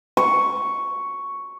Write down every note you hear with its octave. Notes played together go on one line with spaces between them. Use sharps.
C#6